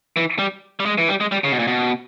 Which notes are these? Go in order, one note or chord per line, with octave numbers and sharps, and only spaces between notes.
E3
G3
G3
G#3
E3
G3
G#3
G3
C#3
B2
A#2
B2